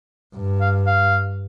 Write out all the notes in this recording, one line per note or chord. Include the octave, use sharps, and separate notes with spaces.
G2
F5
F5